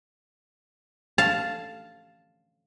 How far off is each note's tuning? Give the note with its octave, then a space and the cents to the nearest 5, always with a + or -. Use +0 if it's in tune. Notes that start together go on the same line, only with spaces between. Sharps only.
F5 +0 A5 +0